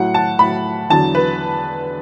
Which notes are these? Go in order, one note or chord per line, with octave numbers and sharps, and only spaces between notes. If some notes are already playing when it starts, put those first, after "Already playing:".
Already playing: A2 F#3 F#5
A5
A2 F#3 B5
E2 D3 F#3 A5
B4